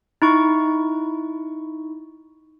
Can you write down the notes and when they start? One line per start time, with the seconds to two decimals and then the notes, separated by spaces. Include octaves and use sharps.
0.22 D#4 E4 C#6